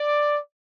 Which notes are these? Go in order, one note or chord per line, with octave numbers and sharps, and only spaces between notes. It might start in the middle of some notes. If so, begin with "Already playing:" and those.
Already playing: D5